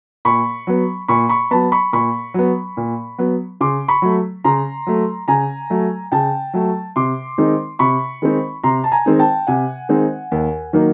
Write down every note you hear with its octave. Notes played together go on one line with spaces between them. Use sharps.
A#2 B5 C#6
F#3 B3
A#2 B5 C#6
B5 C#6
F#3 B3 A5 B5
B5 C#6
A#2 B5 C#6
F#3 B3
A#2
F#3 B3
C#3 C6 D6
B5 C#6
F#3 A3
C#3 A#5 C6
F#3 A3
C#3 G#5 A#5
F#3 A3
C#3 G5 A5
F#3 A3
C3 C6 D6
D#3 G#3 C4 D#4
C3 B5 C#6
D#3 G#3 C4 D#4
C3 A#5 C6
A5
G#5 A#5
D#3 G#3 C4 D#4
G5 A5
C3 F#5 G#5
D#3 G#3 C4 D#4
D#2
D#3 F#3 A#3 D#4